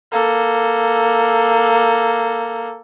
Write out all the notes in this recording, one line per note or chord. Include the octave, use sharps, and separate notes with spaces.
A#3 A4